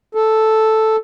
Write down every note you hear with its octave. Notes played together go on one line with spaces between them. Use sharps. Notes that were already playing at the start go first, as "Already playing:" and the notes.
A4